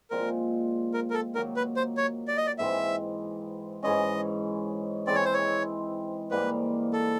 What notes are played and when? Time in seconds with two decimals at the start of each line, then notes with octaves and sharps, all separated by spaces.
0.11 A#2 F3 G#3 C4 A#4
0.94 A#4
1.10 A#4
1.14 A4
1.35 D#3 F#3 A#3 A#4
1.56 B4
1.76 C5
1.97 C#5
2.28 D5
2.37 D#5
2.47 D5
2.59 G#2 E3 G#3 C4 E5
3.83 G#2 E3 G#3 C#4 D#5
5.07 E3 G#3 C4 D5
5.15 C#5
5.25 C5
5.33 C#5
6.31 G#2 E3 G3 A#3 B4
6.93 A4